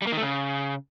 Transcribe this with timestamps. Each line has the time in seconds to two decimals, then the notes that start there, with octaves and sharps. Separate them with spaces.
0.02 G3
0.07 A#3
0.12 D#3
0.17 A3
0.22 C#3